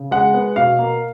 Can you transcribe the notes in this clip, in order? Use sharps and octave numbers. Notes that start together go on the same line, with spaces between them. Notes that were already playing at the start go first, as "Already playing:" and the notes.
Already playing: C#3
G#3 F#5
B3
B2 F5
A#3